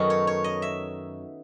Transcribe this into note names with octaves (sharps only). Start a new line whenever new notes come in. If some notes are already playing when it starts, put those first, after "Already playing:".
Already playing: F#2 D#3 F#3 B3 D#4 F#4 A4
C#5
C#5
D#5
E5